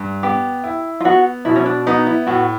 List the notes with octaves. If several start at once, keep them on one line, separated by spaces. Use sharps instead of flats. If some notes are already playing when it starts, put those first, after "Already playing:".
Already playing: G2
B3 G4
E4
F4
B3 F#4
B2 E4
C#4
D4
B3 D#4
E4
A2 F#4